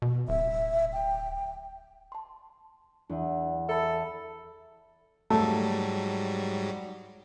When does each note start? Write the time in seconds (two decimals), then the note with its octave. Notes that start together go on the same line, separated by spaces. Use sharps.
0.02 B2
0.28 D1 E5
0.93 G5
2.12 A5 C6
3.10 E2 D4 E5
3.69 A4 E5 A#5 B5
5.30 G#2 F#3 G3 A3